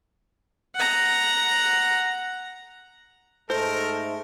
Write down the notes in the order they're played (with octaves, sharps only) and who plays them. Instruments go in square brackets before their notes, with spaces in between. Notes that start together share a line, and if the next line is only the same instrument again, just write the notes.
[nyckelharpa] F#5 A#5
[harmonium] G#2 G#3 A3 [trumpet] A4 [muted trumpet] A#4 [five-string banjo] C5